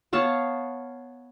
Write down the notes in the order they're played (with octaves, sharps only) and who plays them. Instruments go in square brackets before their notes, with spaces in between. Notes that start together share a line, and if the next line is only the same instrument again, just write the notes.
[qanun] B3 C#5 F5 A5